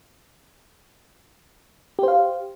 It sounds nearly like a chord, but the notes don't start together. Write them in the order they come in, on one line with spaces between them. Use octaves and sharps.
G4 C5 F5